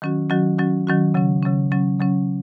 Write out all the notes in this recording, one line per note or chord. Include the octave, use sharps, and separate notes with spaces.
D#3 F#3 C#4 F#4
D#3 F#3 C#4 F#4
D#3 F#3 C#4 F#4
D#3 F#3 C#4 F#4
C#3 F#3 C#4
C#3 F#3 C#4
C#3 F#3 C#4
C#3 F#3 C#4